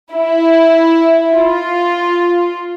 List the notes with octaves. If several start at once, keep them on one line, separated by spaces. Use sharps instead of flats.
E4
F4